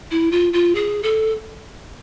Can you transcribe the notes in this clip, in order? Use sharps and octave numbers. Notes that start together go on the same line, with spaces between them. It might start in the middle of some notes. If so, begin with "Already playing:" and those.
E4
F4
F4
G#4
A4